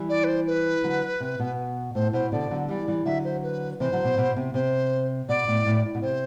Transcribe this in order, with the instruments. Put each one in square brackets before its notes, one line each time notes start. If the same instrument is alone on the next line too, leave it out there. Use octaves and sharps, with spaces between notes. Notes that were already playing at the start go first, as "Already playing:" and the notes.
Already playing: [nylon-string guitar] E3 G3
[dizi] D5
B4
C5
B4
[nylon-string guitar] D3 F#3
C3
B2
[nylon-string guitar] A2 [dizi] C5
[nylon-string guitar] B2 [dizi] C5
[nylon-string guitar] B2 D3 [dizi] D5
[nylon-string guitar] D3 F#3
[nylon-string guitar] E3 G3 [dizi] D5
[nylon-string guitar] E3 G3
[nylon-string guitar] D3 F#3 [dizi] E5
[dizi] C5
B4
[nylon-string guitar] C3 E3 [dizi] C5
[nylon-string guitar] D3 F#3
B2
B2
C3
[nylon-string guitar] C3 [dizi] C5
[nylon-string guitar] B2 [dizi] D5
[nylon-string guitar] A2
A2
A2
B2
[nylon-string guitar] C3 [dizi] C5